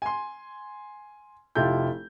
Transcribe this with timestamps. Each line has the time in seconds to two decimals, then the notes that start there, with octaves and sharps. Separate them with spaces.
0.02 G#5 C6
1.55 F1 E4 F4 G4 A4 G6